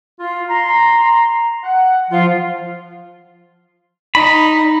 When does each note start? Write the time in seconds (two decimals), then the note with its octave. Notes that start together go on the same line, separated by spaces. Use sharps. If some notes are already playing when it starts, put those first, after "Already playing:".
0.18 F4
0.48 A#5 C6
1.63 F#5
2.11 F3 F4
4.15 D#4 B5